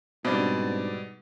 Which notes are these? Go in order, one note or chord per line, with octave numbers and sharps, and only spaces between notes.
G#2 B2 G3 C4 D4 B4 D5